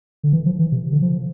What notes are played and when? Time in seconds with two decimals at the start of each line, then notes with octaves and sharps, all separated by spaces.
0.23 D3
0.33 E3
0.46 F3
0.59 E3
0.72 C3
0.92 D3
1.02 F3